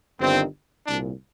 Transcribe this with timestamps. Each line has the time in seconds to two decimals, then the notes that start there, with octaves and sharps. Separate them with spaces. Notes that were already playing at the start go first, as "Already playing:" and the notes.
0.19 G1 G2 D#3 C4
0.87 C2 A#2 D4